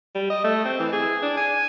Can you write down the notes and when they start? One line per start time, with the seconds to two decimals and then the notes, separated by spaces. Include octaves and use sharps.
0.15 G3
0.30 D#5
0.44 A3
0.65 C4
0.80 E3
0.93 G#4
1.22 D4
1.37 G#5